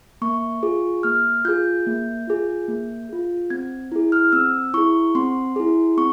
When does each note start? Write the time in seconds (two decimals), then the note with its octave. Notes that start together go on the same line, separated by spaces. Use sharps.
0.22 A#3 C#6
0.63 F4 G#4
1.03 A#3 F6
1.45 F4 G#4 G6
1.87 A#3
2.27 F4 G#4
2.68 A#3
3.09 F4 G#4
3.50 C4 G#6
3.92 E4 G#4
4.12 F6
4.32 C4 E6
4.74 E4 G#4 C#6
5.15 C4 C6
5.56 E4 G#4
5.97 C4 C#6